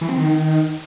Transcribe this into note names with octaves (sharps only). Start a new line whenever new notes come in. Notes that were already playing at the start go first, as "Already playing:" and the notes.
E3
C4
D#3